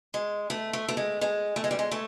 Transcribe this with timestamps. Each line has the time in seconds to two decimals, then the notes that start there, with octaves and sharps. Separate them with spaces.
0.14 G#3
0.50 A3
0.73 A3
0.88 A3
0.97 G#3
1.21 G#3
1.56 A3
1.64 G#3
1.71 G3
1.79 G#3
1.91 A3